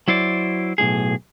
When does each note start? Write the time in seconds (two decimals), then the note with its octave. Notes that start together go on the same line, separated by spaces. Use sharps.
0.08 F#3 E4 C5 D5
0.78 B1 F2 A2 G#4